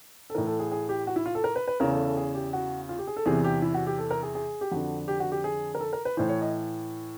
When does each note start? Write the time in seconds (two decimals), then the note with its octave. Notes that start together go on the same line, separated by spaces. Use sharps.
0.30 A4
0.35 A2 E3 A#4
0.47 A4
0.59 G#4
0.71 G#4
0.89 G4
1.07 F#4
1.16 E4
1.26 F4
1.35 A4
1.44 A#4
1.56 B4
1.67 B4
1.80 E2 C#3 E3 A#4
1.93 A4
2.05 A4
2.17 G#4
2.35 G4
2.53 F#4
2.89 F4
2.99 G4
3.07 G#4
3.17 A4
3.26 E2 C3 E3 G#4
3.44 G4
3.62 E4
3.74 F#4
3.87 G4
3.98 A4
4.11 A#4
4.23 G#4
4.35 G#4
4.61 G4
4.72 F2 D3 F#4
5.08 G4
5.20 F#4
5.32 G4
5.44 G#4
5.75 A#4
5.80 A4
5.93 A#4
6.05 B4
6.17 A2 E3 C5
6.29 C#5
6.42 D#5